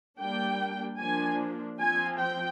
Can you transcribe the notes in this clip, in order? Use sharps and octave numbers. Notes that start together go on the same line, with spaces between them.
G3 A#3 D4 G5
F3 A#3 D4 G#5
F3 C4 G#5
G5